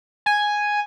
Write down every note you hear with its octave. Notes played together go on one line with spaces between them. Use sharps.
G#5